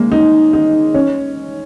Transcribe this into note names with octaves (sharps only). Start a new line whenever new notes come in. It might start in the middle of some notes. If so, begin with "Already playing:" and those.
Already playing: G#3 A#3
D#4
D#4
C#4